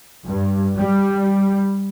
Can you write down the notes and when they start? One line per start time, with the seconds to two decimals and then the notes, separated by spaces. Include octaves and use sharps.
0.25 G2
0.77 G3